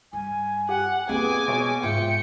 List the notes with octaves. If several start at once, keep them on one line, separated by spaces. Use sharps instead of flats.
G2 G#5
G4 F#5
F2 A#3 B3 G#4 G#5 D6
B2 C#5 C#6
G#2 F4 E5 G5 C#7